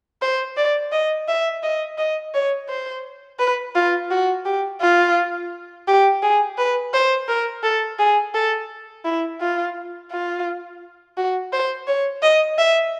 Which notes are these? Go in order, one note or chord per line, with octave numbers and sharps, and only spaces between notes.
C5
D5
D#5
E5
D#5
D#5
C#5
C5
B4
F4
F#4
G4
F4
G4
G#4
B4
C5
A#4
A4
G#4
A4
E4
F4
F4
F#4
C5
C#5
D#5
E5